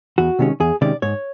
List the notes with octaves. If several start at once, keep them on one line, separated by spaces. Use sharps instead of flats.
E2 F#4
C3 D#3 G#3 C#4
E2 G#4
C3 D#3 G#3 C#4 D5
G#2 C#5